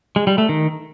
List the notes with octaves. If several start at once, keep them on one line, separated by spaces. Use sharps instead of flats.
G#3
G3
A3
D#3